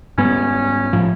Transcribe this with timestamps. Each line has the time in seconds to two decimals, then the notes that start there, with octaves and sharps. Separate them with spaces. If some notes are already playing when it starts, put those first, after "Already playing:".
0.18 G#2 G3 B3 C#4
0.93 A2 F3